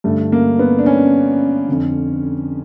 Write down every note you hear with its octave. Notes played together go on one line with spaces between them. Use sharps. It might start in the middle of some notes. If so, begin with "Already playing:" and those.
G2 D3 A3
A#3
B3
D4
C#4
F2 D3